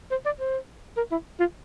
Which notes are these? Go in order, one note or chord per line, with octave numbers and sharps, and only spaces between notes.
C5
D5
C5
A#4
E4
F4